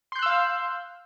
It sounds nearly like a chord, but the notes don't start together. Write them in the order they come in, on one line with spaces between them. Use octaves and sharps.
C6 G6 F#6 E6 F5